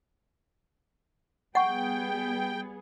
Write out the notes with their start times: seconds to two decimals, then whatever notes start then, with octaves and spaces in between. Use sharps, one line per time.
1.55 G3 B3 G#4 F#5 G5 C#6